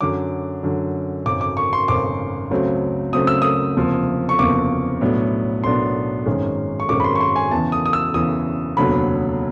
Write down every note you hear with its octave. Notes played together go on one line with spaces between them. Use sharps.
F#2 D3 F#3 D6
F#2 D3 F#3
G#1 F#2 C#3 D6
D6
C#6
C6
G#1 F#2 C#3 D6
C#2 C#3 F#3 A3 C4
C#2 C#3 F#3 A3 C4 D#6
E6
D#6
F#1 E2 C3 F3 A#3
C#6
F#1 E2 C3 F3 A#3 D6
B1 A2 F#3 B3 D4
B1 A2 F#3 B3 D4 C6
G#1 F#2 D#3 G#3 C#4
C#6
G#1 F#2 D#3 G#3 C#4 D6
B5
C6
C#6
C6
G#5
E2 C#3 E3 A5
D#6
D#6
E6
E2 C#3 E3 D#6
F1 D#2 D3 F#3 B3 B5